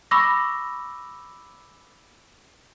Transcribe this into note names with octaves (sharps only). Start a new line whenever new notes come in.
B5 C#6 D6 E6 A#6